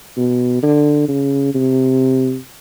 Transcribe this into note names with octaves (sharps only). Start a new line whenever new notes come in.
B2
D3
C#3
C3